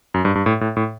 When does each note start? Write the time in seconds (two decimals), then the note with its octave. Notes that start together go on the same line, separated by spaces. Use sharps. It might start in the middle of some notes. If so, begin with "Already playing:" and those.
0.14 F#2
0.25 G2
0.35 G2
0.46 A2
0.61 A2
0.77 A2